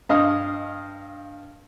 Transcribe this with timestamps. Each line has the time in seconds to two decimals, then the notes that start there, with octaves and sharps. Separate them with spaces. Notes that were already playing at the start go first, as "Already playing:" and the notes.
0.09 G2 D#5 F5 D#6